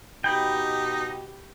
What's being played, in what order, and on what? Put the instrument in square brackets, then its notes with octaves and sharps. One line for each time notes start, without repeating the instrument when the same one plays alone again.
[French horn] B2 [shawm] D#4 [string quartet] G4 [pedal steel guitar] G5 B5